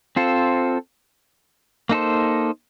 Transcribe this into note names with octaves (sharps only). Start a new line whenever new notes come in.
C4 F4 A4 C5
A#3 D#4 A4 C5